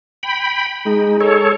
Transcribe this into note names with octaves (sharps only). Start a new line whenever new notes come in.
G5 B5
G#3 D#4
A4 C#5